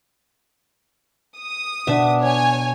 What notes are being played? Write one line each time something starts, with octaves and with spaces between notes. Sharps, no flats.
D#6
B2 D4 E5
C#5 G#5